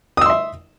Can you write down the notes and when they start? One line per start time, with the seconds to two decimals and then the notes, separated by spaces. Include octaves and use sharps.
0.17 D#6
0.21 E6
0.26 C6
0.30 E5